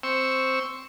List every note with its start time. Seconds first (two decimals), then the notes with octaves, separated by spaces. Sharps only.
0.03 C4 C#6 E6